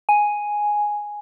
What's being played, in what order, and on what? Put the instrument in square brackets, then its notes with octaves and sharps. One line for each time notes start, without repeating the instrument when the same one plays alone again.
[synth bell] G#5